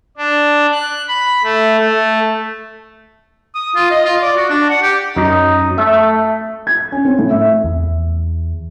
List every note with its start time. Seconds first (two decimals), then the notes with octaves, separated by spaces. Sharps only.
0.17 D4
0.72 F#6
1.08 B5
1.44 A3
1.79 A3
3.55 D#6
3.75 F4
3.91 D#5
4.05 F4
4.22 D5
4.36 F#4
4.50 D4
4.70 F#5
4.82 G4
5.16 F#2 D#4
5.78 A3 E5
6.67 G#6
6.92 C#4
7.05 C4
7.19 A2
7.31 E5
7.64 E2